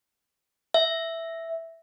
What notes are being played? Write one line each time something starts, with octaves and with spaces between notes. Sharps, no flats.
E5